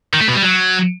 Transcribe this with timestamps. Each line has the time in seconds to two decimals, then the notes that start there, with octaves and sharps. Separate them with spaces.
0.13 D#3
0.21 A3
0.28 B2
0.35 G3
0.43 F#3